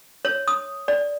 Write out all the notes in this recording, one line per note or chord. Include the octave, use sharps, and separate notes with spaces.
C#5
D#6
D5